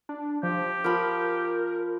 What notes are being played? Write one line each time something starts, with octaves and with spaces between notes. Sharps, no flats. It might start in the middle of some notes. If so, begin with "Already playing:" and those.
D4
F3 G4
F3 A#4 B5